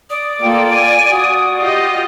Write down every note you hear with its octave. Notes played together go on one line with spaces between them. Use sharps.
D5 D#6
A#3 F4 A4 G5
G#5 D#7
F#4 D#6
F4 G4 D#5